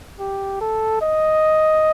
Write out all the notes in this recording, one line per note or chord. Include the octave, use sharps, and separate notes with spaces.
G4
A4
D#5